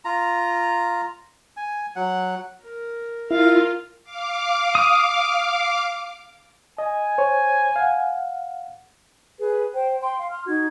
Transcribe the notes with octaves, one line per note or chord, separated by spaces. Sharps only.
F4 A#5
G#5
F#3 F#5
A#4
E4 F4 A#4 F5
F5 D6
D#6
D#5 G#5
C5 C#5
F5 F#5
G#4 B4
C5 G5
G5 C6
F5
C6 F6
D#4 F#4 G#6